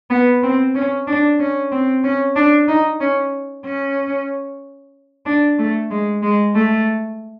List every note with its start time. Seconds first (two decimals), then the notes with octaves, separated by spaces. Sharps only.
0.10 B3
0.43 C4
0.75 C#4
1.07 D4
1.39 C#4
1.71 C4
2.04 C#4
2.36 D4
2.68 D#4
3.00 C#4
3.65 C#4
5.26 D4
5.59 A3
5.90 G#3
6.22 G#3
6.55 A3